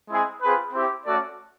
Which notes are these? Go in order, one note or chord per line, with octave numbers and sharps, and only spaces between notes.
G#3 C4 E4 G#4
C4 F4 G#4 B4
C4 E4 G4
A3 C#4 F#4 A4 D5